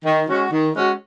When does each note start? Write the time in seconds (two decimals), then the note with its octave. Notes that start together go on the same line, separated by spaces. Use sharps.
0.05 D#3
0.28 G#3 C#4 F#4
0.51 D#3
0.74 G#3 C#4 F#4